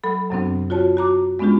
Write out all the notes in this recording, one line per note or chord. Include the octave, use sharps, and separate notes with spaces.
F#3 A4 B5
F#2 C3 F#3 B3 C4 D4
F4 F#4 C#5 A5
F#4 A#5 D6
G#3 B3 C#4 D4 F4 G4